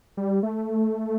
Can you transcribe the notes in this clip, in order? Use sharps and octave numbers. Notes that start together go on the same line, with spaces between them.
G3
A3